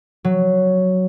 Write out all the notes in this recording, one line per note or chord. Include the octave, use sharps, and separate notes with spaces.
F#3